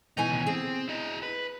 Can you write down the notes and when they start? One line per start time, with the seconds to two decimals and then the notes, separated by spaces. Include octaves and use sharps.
0.17 B2 E3 D#4 G#5
0.30 D#2 C#3
0.47 C4 G#4
0.88 E4 D#5
1.23 B4